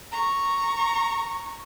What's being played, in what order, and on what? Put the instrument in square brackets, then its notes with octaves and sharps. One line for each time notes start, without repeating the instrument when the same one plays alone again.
[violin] A#5 C#6